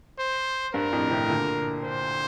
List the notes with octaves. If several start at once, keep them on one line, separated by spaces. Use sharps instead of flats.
C5
G2 A#4
F2 A2
A2 C3
A#2 D3
C5